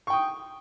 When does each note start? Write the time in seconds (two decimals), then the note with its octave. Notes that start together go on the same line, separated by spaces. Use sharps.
0.07 C#6
0.10 G5
0.13 D#6